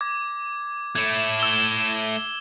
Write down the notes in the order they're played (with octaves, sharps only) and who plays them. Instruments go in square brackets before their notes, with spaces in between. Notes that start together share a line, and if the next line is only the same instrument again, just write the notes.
[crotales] D6 G#6
[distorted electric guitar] A3 E4 [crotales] G#6
[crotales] E6 E7 G7